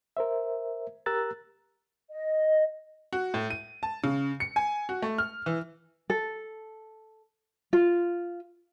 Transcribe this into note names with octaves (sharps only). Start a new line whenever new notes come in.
A#4 C5 E5
G4 A#4 A#5 E6 F#6 A6
D#5
F#4
A2
D#7
A5
C#3
C#7
G#5
F#4
A3
F6
E3
A4
F4